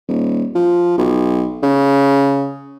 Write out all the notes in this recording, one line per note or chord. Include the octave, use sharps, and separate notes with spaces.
D#1
F3
B1
C#3